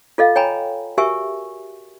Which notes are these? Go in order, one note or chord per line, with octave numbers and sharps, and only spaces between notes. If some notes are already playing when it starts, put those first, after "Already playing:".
F4 A4 D#5 F5
C#5 G5 G#5 A#5 B5
F#4 G4 A#4 E5 G#5 C#6